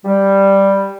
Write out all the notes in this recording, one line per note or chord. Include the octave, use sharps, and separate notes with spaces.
G3